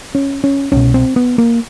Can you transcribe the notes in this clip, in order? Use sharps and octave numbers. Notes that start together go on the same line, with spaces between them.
C#4
C#4
C2 B2 C#4
C4
B3
A#3